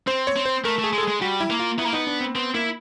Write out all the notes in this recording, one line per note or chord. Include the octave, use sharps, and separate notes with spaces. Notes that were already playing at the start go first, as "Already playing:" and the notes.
C4 C5
C#5
C4
C5
A3 A#4
A3 G#4
G#3
A4
G#3 G#4
G3 F#4
E4
A#3
F4
B3 E4
A#3
B3 D#4
D4
C4
B3 C4
A#3 E4